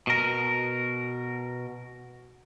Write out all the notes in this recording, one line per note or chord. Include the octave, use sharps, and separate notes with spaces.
B2 A#4